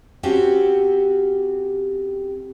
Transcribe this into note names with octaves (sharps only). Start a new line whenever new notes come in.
C4 C#4 F#4 G4 A4